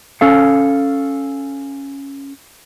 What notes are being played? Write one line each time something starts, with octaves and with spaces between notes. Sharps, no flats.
C#4 A4 F5